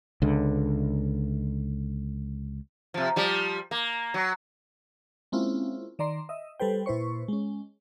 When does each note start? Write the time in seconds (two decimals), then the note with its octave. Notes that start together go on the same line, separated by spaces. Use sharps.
0.22 C#2 D3
2.94 C3 F3
3.16 F3 G3
3.71 A#3
4.14 F#3
5.32 G#3 A#3 C4 C#4 E4 F4
5.99 D#3 D5 A#5 C6
6.29 D#5 E5
6.60 G3 A4 B4 C5 G5
6.86 A#2 E4 B4 C5 C#6
7.28 G#3 C#4